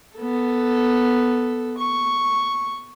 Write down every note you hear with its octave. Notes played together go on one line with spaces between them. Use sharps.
B3 A4
C#6